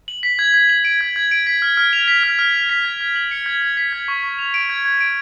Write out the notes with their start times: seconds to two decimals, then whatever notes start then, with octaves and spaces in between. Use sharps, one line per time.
0.08 F#7
0.23 B6
0.39 G#6
0.54 G#6
0.69 F#7
0.85 D7
1.01 G#6
1.16 G#6
1.31 D7
1.47 B6
1.62 F6
1.77 F6
1.93 F7
2.08 B6
2.23 F6
2.39 F6
2.54 F7
2.70 B6
2.85 G#6
3.01 G#6
3.16 F#7
3.31 C#7
3.46 G#6
3.62 G#6
3.77 B6
3.93 G#6
4.08 C#6
4.24 C#6
4.39 F7
4.54 D7
4.70 G#6
4.85 G#6
5.00 D7